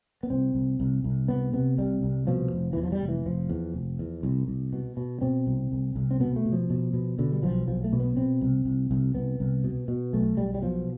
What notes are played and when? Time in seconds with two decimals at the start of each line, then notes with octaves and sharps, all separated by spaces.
0.23 B3
0.30 C2 C4
0.55 C2
0.80 C2
1.04 C2
1.28 C3 B3
1.53 C3 B3
1.78 C2 G3
2.03 C2
2.27 B2 F3
2.52 F1
2.73 E2 E3
2.83 F3
2.92 G3
3.01 F1
3.09 E3
3.26 F1 F3
3.49 E2
3.74 F1
3.99 E2
4.23 C2
4.48 C2
4.73 B2
4.97 B2
5.21 B2 C4
5.47 C2
5.72 C2
5.96 C2
6.11 C4
6.20 B2 B3
6.36 A3
6.45 B2
6.53 F3
6.70 B2
6.93 B2
7.19 B2 D3
7.32 G3
7.43 B1 F3
7.68 B1 F3
7.84 A3
7.93 B2
8.00 B3
8.17 B2 C4
8.41 C2
8.65 C2
8.91 C2
9.15 C2 B3
9.40 C2
9.64 B2
9.88 B2
10.13 B1 A3
10.37 B1 G3
10.54 G3
10.62 B2 F3